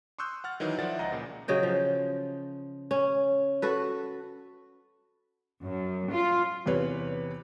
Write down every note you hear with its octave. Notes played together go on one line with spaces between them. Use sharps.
C6 C#6 D#6 E6 F#6 G6
F#5 F6 A6
D#3 E3 F#3 D#4
D#3 F3 D5 E5 F#5 A6
C#2 D#5 F#5 A#5 A#6
A#2 C#3
C#3 F#3 D#5 G5
F3
C#4
F#4 A4 B4
F#2
F4
E2 C3 B4 C#5